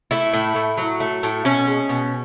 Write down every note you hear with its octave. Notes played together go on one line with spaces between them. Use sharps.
A3 E4
A2
A2
F#3
A3
A2
B2 C#4
G#3
B2